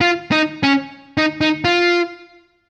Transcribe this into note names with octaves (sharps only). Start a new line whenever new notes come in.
F4
D#4
C#4
D#4
D#4
F4